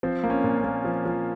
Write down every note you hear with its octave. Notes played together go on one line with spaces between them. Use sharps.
F3 C4
A#3
C#4
A#2
C#4
A#3
F3
F3